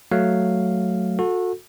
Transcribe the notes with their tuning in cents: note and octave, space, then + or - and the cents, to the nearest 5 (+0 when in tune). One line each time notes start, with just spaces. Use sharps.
F#3 +0 A3 +0 F5 +0
F#4 -30 A4 +10